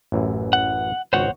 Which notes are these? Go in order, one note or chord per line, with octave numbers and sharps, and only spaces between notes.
A1 F#2 E3
F#5
G#1 C#2 F#4 C5 C#5 F#5